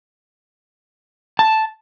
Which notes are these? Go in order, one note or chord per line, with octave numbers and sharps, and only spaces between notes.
A5